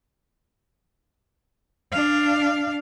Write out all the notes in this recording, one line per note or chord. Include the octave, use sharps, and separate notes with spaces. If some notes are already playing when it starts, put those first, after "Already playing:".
D4 F5